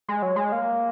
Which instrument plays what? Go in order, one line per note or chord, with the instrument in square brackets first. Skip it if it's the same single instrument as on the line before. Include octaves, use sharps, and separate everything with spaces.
[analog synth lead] G#3
F#3
G#3
A#3